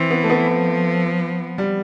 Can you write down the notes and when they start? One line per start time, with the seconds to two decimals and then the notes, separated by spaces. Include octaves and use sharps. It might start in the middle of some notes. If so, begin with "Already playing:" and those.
Already playing: E3 C4
0.11 B3
0.24 A3
0.30 B3
0.47 F3
1.58 G3